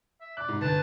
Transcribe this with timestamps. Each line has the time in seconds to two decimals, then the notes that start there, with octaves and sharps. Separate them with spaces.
0.21 E5
0.37 D5 F#6
0.48 G#2
0.61 G1 B4 A5